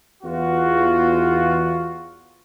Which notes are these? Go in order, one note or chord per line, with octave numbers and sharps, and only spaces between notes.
E2 F4 F#4